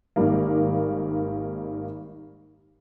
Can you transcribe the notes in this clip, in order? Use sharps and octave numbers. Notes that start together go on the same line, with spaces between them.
G#1 G#2 G3 A#3